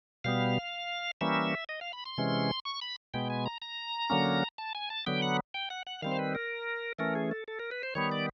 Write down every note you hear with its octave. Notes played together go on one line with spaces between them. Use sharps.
B2 G3 B3 F5
E3 G3 A#3 C#4 E5
D#5
F5
B5
C6
C3 E3 G#3 C#4
C#6
B5
B2 G#3 B3 G5
G#5
A#5
A#5
D3 F#3 A#3 C#4
A5
G#5
A5
D3 F#3 B3 G5
F#5
G5
F#5
F#5
D#3 G3 C4 F5
C5
B4
A#4
E3 A3 C#4 A#4
G#4
A4
A4
A#4
B4
C5
D#3 G3 B3 C#5
D5